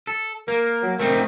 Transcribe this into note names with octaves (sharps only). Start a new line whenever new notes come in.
A4
A#3 A#4
F#3
A3 C4 D#4 A#4